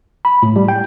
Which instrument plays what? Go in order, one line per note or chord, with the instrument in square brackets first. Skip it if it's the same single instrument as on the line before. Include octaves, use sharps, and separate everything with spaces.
[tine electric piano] B5
A2
G3
G5